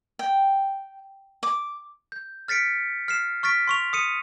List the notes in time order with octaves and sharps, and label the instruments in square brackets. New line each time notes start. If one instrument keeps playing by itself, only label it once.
[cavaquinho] G5
D6
[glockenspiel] G6
F6 A6 B6 C#7 D7
F6 C7 E7
C#6 F6 A6 B6 D7
C6 C#6 F7
D#6 C#7 D#7